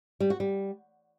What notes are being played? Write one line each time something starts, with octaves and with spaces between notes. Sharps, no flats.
G3
F#4
G3